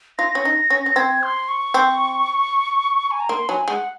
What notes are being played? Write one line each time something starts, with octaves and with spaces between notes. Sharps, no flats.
F4 A#6
C#4
D#4
C#4
C#4
C4 G#6
C6
C#6
C4
G#5
A#5
A#3 C6
F#3 G#5
G#3 F#5